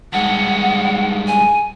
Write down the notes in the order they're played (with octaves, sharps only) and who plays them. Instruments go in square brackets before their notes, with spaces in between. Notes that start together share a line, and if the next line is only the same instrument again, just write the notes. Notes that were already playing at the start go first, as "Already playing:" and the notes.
[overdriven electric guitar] G2 G#3 [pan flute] F#5
[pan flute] G#5